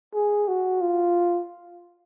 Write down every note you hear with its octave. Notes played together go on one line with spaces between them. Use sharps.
G#4
F#4
F4